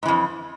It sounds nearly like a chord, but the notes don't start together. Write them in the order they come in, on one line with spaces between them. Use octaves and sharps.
G#2 E3 F2